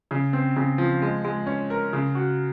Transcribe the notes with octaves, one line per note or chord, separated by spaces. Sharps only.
C#3
C4
C#3
F3
G#3
G#3
C#4
A#4
C#3
F#4